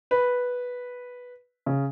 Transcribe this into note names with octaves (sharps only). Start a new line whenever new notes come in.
B4
C#3